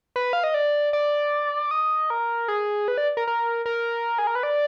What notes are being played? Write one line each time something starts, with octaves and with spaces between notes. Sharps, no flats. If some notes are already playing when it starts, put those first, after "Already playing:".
B4
F5
D#5
D5
D5
D#5
A#4
G#4
B4
D5
A#4
A#4
A#4
G#4
A#4
B4
D5